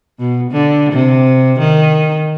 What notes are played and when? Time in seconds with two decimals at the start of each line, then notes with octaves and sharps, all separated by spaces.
0.20 B2
0.51 D3
0.93 C3
1.59 D#3